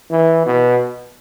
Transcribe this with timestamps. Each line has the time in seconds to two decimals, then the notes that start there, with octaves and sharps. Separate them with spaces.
0.11 E3
0.46 B2